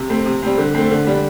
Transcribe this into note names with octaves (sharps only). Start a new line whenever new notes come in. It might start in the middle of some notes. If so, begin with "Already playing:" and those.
Already playing: C3
A3 C4
C3
G3 C4
D3
A3 C4
D3
G3 D4